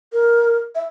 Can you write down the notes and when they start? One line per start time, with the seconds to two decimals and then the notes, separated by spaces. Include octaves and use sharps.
0.13 A#4
0.75 E5